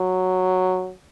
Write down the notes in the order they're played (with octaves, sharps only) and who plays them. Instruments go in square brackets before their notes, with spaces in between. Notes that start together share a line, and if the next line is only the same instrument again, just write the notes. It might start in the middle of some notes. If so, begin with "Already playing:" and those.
Already playing: [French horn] F#3